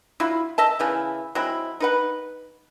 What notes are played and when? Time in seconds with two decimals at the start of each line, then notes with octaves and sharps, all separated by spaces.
0.20 F#3 E4 F4
0.58 D#5 E5 A5
0.79 C#3 E3 E4
1.35 F#3 G#3 C4 E4
1.80 D#4 B4 F#5